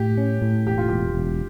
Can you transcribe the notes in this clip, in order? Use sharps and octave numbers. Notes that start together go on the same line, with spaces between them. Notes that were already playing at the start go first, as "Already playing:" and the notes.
Already playing: A2 G4
C#4
A2
E1 G4
F4
E1 G4
E1